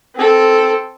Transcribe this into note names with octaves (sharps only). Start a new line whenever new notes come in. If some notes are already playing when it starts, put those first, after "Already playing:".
C4 A4